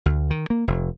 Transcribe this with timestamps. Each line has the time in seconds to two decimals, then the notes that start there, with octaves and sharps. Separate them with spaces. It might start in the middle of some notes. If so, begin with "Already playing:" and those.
0.06 D2
0.30 D#3
0.50 A#3
0.68 F1